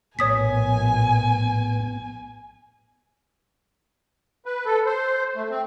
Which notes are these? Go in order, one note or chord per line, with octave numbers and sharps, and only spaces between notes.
A#1 A2 B3 C#5 G#5 D#6 B6
B4
A4
C5
A3
C4